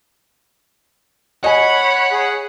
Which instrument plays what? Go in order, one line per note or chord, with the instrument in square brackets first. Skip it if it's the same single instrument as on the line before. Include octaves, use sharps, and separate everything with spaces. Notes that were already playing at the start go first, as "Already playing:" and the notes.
[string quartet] C#5 B5 F#6 [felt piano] D#5 G#5 [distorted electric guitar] F#5
[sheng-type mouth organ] G#4